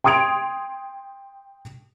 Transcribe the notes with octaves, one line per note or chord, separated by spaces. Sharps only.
G5 C6 D#6 G#6 D7 F7